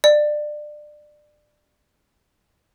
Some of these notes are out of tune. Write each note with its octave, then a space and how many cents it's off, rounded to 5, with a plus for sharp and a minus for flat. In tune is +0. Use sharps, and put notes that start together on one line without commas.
D5 +25